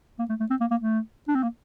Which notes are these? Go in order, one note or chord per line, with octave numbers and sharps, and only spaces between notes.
A#3
A3
A3
C4
A#3
A#3
A3
D4
C4
A#3